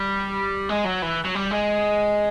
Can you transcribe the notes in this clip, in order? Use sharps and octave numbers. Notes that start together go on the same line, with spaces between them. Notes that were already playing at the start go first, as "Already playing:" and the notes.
Already playing: G3
G#3
F#3
E3
F#3
G3
G#3